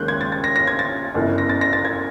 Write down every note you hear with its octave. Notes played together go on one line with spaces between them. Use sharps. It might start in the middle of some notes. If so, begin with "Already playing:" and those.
Already playing: D#2 D#3 G#3 C#4 F#6 G6
G#6
A6
A6
A#6
A#6
G#6
A6
G1 F#2 C#3 E3
A#6
A6
A#6
A6
G#6